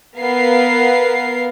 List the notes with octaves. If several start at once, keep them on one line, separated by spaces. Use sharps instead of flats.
B3 A#4 F5 C7